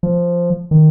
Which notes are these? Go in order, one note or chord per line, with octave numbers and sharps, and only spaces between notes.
F3
D#3